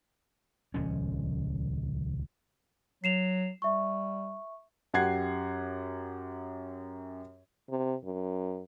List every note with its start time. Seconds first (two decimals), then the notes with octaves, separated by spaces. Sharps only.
0.74 D#1 C#2 F3 C#4
3.04 F#3 C7 E7 F7
3.62 G3 E5 C#6
4.94 F#2 G4 F#5 G#6 C7
7.69 C3
8.05 F#2